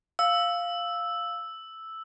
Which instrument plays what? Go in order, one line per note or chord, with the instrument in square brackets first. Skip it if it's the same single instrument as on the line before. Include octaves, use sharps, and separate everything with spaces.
[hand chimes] F5 [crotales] E6